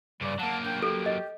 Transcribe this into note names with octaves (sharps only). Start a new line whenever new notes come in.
G2 C#3 G3 D5
F#3 A#3 F5 F#5 A5
D4 A#4 G5
G4 A4
D#5